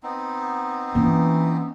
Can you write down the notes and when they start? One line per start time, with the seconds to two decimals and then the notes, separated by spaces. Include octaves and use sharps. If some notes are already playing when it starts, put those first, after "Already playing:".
0.03 B3 C4 D#4
0.95 E3 A#3 C#4